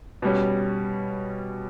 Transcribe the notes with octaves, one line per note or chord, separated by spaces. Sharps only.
B2 G3 C#4